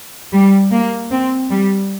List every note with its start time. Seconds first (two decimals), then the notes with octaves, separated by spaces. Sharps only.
0.32 G3
0.71 A#3
1.11 C4
1.50 G3